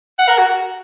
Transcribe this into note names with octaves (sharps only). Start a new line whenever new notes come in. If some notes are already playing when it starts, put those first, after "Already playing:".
F#5
A#4
F#4